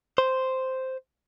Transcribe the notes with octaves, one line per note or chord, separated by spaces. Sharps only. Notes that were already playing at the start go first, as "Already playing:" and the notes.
C5